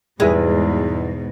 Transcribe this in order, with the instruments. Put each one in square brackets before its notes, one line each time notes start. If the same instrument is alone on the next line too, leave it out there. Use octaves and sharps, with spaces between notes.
[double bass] E2 [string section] G#2 B2 [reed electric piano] G3 E4 B4 [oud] G#3